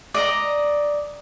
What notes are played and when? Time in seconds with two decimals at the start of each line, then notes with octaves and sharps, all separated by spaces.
0.14 D5 D#5 A#5